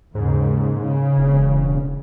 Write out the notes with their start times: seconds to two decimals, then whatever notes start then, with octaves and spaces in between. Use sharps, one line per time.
0.15 D#2 G#2 C#3
0.77 C#3
1.18 E1